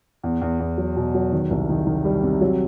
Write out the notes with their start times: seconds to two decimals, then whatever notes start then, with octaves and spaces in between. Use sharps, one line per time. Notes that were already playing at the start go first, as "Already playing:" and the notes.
0.23 E2
0.41 E2
0.60 E2
0.78 F#3
0.96 B2
1.14 F#3
1.32 D#3
1.51 C2
1.69 D#3
1.87 D#3
2.05 G3
2.23 C3
2.41 F#3